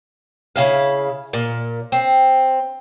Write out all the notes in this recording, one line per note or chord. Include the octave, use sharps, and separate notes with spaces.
C#3 E4 F5
A#2
C4